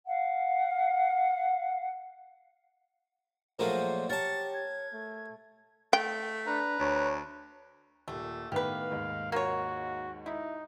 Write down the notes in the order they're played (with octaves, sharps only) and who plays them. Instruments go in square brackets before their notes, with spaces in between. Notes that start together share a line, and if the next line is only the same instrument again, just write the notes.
[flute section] F5 F#5
[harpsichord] A#2 F#3 A3 [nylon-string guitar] F3 G#4 A#4 [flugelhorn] C5
[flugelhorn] G4 [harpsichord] A#4 A5 [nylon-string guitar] C#5 [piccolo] A6
[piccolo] G#6
[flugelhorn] A3
[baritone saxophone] A3 [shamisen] G5
[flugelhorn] D4 [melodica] B4 A#5
[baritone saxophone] D2 [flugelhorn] C#5
[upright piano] D#1 A#2 [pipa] A3
[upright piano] A2 D#3 B3 [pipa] G4 B4 [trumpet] F5
[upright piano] D#2 G#2
[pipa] A#3 F4 C#5 [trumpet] F#4
[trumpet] D#4 [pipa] E4